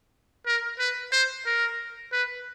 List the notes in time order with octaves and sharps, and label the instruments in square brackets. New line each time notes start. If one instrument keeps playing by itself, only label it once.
[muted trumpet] A#4
B4
C5
A#4
B4